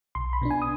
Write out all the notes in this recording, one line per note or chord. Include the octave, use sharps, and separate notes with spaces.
B1 C6
B5
B2 B3 D4
G#5
D#6